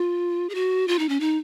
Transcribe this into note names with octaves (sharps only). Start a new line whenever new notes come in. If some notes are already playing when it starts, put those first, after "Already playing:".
Already playing: F4
G#4
F#4
F4
D#4
C#4
D#4